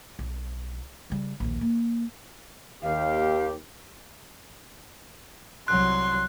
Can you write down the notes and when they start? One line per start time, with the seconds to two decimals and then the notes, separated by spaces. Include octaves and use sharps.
0.19 B1
1.10 C#3 G3
1.40 A#1 D#2
1.61 A#3
2.83 D#2 G4 F5
5.68 C2 F#3 C6 F#6